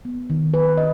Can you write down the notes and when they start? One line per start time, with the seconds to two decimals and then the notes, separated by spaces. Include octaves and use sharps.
0.05 B3
0.30 D#3
0.54 B4
0.77 D#5